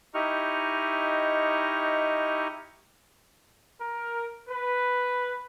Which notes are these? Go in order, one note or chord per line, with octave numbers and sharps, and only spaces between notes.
D#4 E4 G4 D#5 C#6 F6
A#4
B4